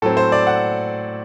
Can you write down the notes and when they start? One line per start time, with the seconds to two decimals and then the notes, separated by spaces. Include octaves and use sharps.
0.02 A2 F#3 C4 A4
0.17 C5
0.32 D5
0.47 F#5